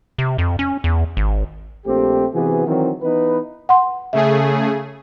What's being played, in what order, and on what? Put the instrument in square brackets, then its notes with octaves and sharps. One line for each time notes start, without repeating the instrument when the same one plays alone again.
[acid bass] C3
F2
C#4
E2
G#1
[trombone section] A#1 A3 C4 G4
C3 E3 B3 F#4 G#4
D#3 E3 F#3 C4
E3 B3 D#4 B4
[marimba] F#5 C6
[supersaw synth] C#3 A3 G#4 [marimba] E5